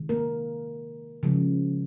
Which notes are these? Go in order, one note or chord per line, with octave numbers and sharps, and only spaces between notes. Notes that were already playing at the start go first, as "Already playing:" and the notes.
Already playing: C3 D#3 G#3
A#3 A#4
C#3 F3 G#3